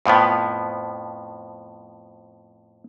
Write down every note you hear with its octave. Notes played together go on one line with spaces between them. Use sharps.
F2 A2 F3 B3